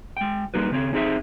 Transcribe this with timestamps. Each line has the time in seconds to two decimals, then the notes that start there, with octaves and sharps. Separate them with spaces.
0.17 G#3 G5
0.54 G3 A#3 D#4 F#4 B4
0.71 C#3 C4 C#5
0.93 C4 D#4 G#4 C5 D5 E5